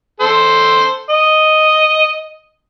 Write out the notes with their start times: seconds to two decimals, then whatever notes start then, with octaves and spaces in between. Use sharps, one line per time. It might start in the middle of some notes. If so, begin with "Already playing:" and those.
0.20 A4 C5
1.10 D#5